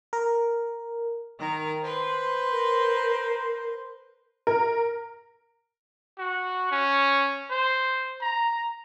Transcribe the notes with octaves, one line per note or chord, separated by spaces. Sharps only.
A#4
D#3 A#4
B4 C5 C6
A#4 C5
A#4
F#4
C#4
C5
A#5